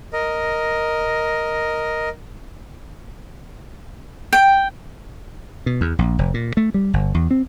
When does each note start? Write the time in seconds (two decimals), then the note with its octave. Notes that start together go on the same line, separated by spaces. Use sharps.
0.13 A#4 D#5
4.33 G5
5.66 B2
5.81 E2
5.99 A#1
6.19 F1
6.34 A#2
6.57 A3
6.74 G3
6.94 G1
7.14 E2
7.31 C4